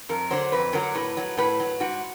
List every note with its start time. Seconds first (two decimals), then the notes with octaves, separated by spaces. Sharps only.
0.09 F2 A#4
0.31 D3 F#3 C5
0.52 F2 B4
0.73 D3 F#3 A#4
0.95 A2 B4
1.17 F#3
1.37 A2 B4
1.60 F#3
1.80 G#2 F#4